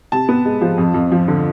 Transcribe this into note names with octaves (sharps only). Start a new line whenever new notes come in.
C3 A5
B3
G#3
F3
F2
F2
F3
D3